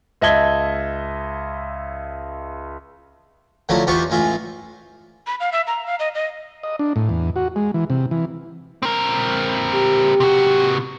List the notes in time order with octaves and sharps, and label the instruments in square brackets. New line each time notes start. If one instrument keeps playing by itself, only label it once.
[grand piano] C#2 D#5 E5 A5 G#6 G7
[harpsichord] D3 F3 F#3 A3 E4
E2 B3 F4 G4 C5 C#6
A1 G#3 F4 E5
[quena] B5
F5
E5
A#5
F5
D#5
D#5
[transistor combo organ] D#5
D4
A2
E2
F#4
G#3
E3
C3
E3
[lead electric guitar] C4 A#4
[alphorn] G4
[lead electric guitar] C3 F#4